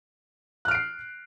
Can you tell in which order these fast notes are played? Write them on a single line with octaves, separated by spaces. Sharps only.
F#6 F6 D7 C7